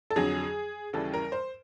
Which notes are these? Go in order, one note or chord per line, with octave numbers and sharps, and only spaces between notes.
A4
F2 D3 F#3 G#4
D#2 C#3 E3 G3 A4
A#4
C5